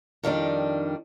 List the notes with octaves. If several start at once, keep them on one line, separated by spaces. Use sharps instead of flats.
F2 D#3 G3 D4